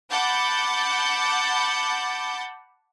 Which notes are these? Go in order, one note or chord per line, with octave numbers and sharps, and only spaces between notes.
F#5 A5 B5 D6 G6 A6